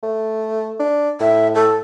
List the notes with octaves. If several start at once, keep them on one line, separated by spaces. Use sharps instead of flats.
A3
D4
A2 E5
A4